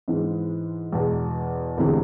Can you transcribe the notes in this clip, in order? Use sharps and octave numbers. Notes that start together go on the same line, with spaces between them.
G#2 E3 G#3
E2 B2 G#3
E1 D2 C3 E3 G#3